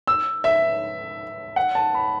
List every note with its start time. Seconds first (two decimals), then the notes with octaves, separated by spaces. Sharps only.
0.07 E6
0.44 E5
1.56 F#5
1.75 A5
1.94 B5